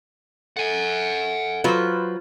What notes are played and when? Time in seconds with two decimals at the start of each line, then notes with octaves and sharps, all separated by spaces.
0.57 A4 F#5 G#5
1.64 F#3 F4 B4 C5